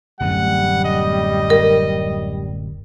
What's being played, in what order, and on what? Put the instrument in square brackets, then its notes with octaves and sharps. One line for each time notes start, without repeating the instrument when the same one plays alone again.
[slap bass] D1 F#2 A3 [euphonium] G3 [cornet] F#5
[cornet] D#5
[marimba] A#4